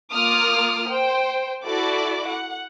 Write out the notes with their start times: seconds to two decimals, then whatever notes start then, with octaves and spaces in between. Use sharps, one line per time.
0.12 A#3 F4 D6 D#6 F6
0.88 C5 G5
1.64 E4 F#4 A4 D5 D6
2.27 F#5